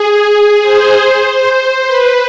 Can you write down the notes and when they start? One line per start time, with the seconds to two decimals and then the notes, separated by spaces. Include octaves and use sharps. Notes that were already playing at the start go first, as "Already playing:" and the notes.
Already playing: G#4
0.62 C5
1.87 B4